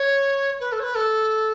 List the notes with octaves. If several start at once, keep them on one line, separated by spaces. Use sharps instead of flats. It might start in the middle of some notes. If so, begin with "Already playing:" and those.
Already playing: C#5
B4
A4
C#5
B4
A4